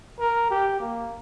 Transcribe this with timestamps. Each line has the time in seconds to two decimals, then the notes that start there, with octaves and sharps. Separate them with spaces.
0.20 A#4
0.50 G4
0.80 A#3